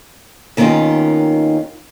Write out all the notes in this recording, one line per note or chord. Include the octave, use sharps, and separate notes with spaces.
D#2 D#3 B3 C#4 F4